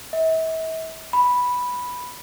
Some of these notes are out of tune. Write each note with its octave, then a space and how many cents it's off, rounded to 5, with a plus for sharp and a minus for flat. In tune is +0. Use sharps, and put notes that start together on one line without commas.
E5 -40
B5 -5